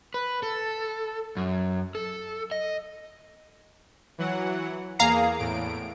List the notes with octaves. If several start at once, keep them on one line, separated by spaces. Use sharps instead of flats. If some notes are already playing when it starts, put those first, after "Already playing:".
B4
A4
F#2
A4
D#5
E3 F#3 F#5
E2 A#3 G#4 F5 A#5 C7
E2 A2 D7